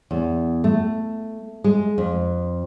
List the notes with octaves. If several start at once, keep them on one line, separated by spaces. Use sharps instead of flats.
E2
A3
G#3
F2